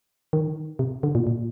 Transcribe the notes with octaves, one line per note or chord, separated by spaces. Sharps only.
D#3
C3
D3
A#2
A#2